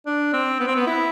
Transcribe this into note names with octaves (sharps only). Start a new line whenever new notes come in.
D4
C4
B3
C4
B3
E4